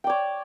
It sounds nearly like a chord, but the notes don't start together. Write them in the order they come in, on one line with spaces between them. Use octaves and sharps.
G5 D5 C#5